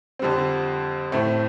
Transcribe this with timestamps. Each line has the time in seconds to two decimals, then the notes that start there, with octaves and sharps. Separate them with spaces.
0.19 F2 D3 G3 C4
1.12 A2 A3 C4